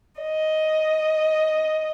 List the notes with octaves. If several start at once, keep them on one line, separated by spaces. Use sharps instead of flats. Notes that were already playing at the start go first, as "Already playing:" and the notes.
D#5